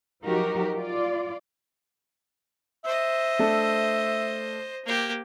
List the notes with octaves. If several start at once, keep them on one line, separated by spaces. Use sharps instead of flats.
F3 F#3 D#4 F#4 G4 A#4
F4 D5
C5 D#5 E5
A3 D4 A4
A#3 G4